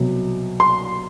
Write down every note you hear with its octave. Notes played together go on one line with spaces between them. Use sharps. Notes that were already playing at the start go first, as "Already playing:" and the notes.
Already playing: C2 B2 F#3
C6